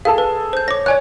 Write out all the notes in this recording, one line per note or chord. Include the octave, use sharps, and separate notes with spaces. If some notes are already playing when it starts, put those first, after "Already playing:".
G#4 A4 F5 A5
B4
C5 G6
C#5 D6 A#6
C#5 D5 G#5 F#6